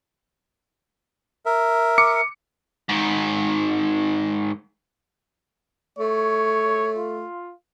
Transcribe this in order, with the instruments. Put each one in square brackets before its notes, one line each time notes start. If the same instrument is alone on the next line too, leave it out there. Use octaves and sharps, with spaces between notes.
[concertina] A#4 E5
[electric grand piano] D6 C#7
[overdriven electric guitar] G#2 D#3
[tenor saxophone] A3 [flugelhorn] C#5
[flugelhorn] F4